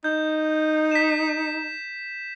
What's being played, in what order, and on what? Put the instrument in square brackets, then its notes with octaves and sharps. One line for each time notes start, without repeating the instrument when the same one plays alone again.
[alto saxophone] D#4 [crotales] G6
[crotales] B6 E7